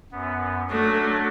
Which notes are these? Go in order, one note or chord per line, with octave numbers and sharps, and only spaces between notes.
F#2 B3
F#3 A3 D4 F#4